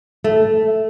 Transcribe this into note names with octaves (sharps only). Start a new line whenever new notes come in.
A3